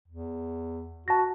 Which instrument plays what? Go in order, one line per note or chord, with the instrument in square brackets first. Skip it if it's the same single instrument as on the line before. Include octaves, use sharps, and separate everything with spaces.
[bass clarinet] E2
[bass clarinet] F#4 [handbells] A5 A#6